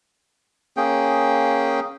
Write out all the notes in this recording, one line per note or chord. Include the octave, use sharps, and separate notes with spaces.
A#3 C#4 G#4 G5